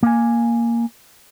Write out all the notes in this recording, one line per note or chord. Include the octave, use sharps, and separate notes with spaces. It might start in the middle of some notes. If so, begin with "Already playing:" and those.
A#3 G#5